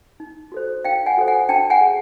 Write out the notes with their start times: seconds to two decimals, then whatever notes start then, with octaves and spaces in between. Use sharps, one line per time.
0.20 D#4
0.52 F#4 A4 C5
0.85 D#4 F5 G5
1.06 F#5 G#5
1.18 F#4 A4 C5
1.28 F#5 G#5
1.49 D4 G5 A5
1.70 F#5 G#5
1.81 G#4